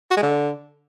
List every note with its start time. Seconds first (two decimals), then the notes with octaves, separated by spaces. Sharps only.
0.11 F#4
0.16 G#3
0.22 D3